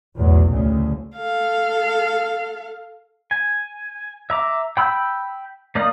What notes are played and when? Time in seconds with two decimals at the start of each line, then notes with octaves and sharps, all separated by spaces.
0.18 B1 E2 A2 F#3
0.49 D2 A2 C#3
1.15 A4 F5
3.31 G#5
4.30 E5 A#5 D6
4.77 G5 B5 E6 F#6 G6
5.75 A#3 D#4 D5 F5 D#6